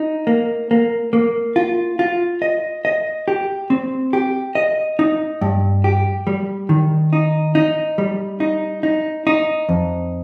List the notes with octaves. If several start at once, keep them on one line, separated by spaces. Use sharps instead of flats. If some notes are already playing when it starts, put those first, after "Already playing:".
Already playing: D#4
A#3
A#3
A#3
F4
F4
D#5
D#5
G4
C4
G4
D#5
D#4
G2
G4
G3
D#3
D#4
D#4
G3
D#4
D#4
D#4
F2